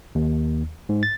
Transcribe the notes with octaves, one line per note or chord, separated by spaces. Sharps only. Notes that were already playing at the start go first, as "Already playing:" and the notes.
D#2
G#2
A6